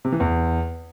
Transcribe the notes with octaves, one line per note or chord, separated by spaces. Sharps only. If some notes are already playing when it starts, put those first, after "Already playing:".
C3
E3
E2